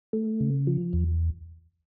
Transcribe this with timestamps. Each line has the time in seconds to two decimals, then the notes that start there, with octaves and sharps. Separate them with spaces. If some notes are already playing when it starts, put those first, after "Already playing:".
0.13 A3
0.41 C#3
0.67 F3
0.93 E2